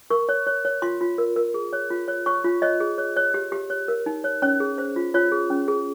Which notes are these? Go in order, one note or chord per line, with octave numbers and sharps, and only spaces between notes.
A#4 C#6
C#5
C#5
C#5
F4 C6
F4
A#4
A#4
G#4
C#5
F4
C#5
C#5 C#6
F4
C#5 D#5
G#4
C#5
C#5
G4
G4
C#5
A#4
D#4
C#5
C#4 C#5
G#4
C5
F4
F4 C#5
G#4
C#4
G#4